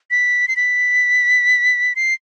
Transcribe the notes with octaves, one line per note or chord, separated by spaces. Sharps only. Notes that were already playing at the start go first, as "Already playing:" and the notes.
B6
C7
B6
C7